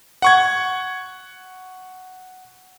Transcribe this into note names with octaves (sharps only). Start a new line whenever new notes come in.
F#5 C#6 G#6